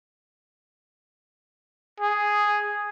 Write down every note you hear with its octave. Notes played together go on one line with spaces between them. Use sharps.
G#4